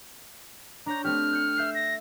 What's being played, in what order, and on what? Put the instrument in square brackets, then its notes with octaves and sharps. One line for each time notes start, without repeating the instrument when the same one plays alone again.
[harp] D4 C#5 G6 [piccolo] A#5
[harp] A3 C4 G4 [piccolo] F6
[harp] F#6 G6 C#7
E5 G6 C7
[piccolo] A#6